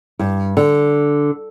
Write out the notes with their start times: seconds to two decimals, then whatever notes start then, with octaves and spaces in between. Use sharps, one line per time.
0.19 G2
0.57 D3